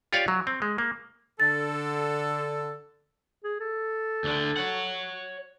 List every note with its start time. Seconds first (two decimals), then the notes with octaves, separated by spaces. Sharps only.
0.13 F4 G4 C#5 D5 F5
0.28 F#3
0.47 C4
0.62 G#3
0.78 A#3
1.40 D3 A4 A6
3.44 G#4
3.60 A4
4.24 D2 D3
4.57 C#5 F#5